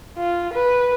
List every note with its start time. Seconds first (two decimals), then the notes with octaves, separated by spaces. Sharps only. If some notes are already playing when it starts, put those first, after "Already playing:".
0.18 F4
0.53 B4